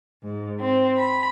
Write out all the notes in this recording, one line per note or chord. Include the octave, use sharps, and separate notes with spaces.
G#2
C4
B5